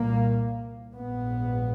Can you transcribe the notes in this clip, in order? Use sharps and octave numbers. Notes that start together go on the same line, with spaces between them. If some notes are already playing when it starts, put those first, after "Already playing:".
Already playing: C2 A#2 A#3
A#1 G#2 B3